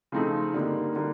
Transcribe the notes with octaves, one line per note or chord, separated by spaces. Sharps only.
C#3 F3 A3 C4 D#4
G2 D3 G3 A#3 D#4
D3 G3 A#3 D#4